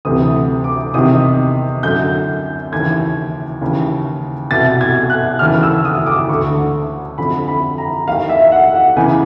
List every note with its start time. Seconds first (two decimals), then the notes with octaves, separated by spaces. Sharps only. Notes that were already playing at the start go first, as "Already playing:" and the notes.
0.05 D2 C3 E3 D#6
0.64 D6
0.94 E2 C3 D#3 D#6
1.83 F#2 D3 G6
2.72 D#2 C#3 E3 G#6
3.61 D#2 C#3 E3
4.51 C2 B2 A6
4.81 G#6
5.10 F#6
5.39 D#2 C#3 E3 F6
5.63 E6
5.85 D#6
6.06 D6
6.29 D2 D3 C#6
7.18 F2 D3 B5
7.48 B5
7.78 A#5
8.07 D#2 D#3 F5
8.30 E5
8.52 F#5
8.75 F#5
8.96 E2 C#3 E3 G#5